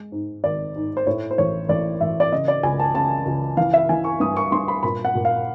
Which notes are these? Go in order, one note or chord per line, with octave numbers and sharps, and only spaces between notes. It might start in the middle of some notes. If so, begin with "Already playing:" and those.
Already playing: G#3
G#2
G#1 D5
G#2
C5
A2 C#5
C5
A1 C#5
A1 D5
A1 E5
D5
C#3 D#5
D5
C#2 G#5
A5
C#3 A5
C#2
E3 F5
E5
E3 G#5
C#6
G2 D#6
C#6
G2 C6
B5
A#2 B5
F#5
A#2
F5